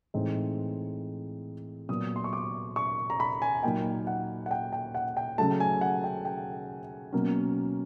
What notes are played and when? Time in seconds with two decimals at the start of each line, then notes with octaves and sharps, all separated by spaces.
0.14 A2 E3 G#3 C4 D#4
1.89 A#2 F#3 B3 D#6
2.16 C6
2.24 C#6
2.33 D6
2.76 C#6
3.10 A#5
3.20 B5
3.42 G#5
3.63 A#2 F#3 A#3 D#4 G5
4.07 F#5
4.46 F#5
4.51 G5
4.73 G5
4.95 F#5
5.17 G5
5.38 C#3 F#3 A3 A5
5.60 G#5
5.81 F#5
6.04 G5
6.25 G5
7.13 B2 F#3 A#3 C#4